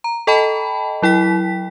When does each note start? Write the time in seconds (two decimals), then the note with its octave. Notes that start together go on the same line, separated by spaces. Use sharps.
0.04 A#5
0.27 A4 D#5 G5 A5 B5
1.02 F#3 E4 G5 B6